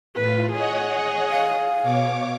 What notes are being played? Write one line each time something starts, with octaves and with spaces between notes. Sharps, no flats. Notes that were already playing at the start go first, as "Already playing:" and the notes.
A2 F4 B4
G#4 C#5 D#5 F#5
F5
B2 C#5 D6